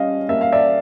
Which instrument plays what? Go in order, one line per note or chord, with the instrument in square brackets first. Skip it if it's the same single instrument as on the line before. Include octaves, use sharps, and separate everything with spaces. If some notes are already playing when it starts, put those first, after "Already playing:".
Already playing: [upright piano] G3 C#4 D#5 F5
A#3 E5
F5
D5 E5